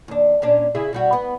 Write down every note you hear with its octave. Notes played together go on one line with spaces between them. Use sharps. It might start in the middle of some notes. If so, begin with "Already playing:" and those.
D#2 D4
A#2 C#4 D4
C#3 E4 G#4
B2 G3 F#4
B3